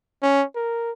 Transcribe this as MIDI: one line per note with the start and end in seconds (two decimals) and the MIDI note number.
0.22 0.44 61
0.55 0.91 70